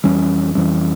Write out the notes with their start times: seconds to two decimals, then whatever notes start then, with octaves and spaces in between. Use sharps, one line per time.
0.04 F2 E3 G3 C#4
0.55 F2 E3 G3 C#4